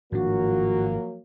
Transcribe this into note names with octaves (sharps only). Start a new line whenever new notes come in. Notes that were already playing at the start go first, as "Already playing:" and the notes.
G#1 A2 F3 F#3 A#3 D4 F#4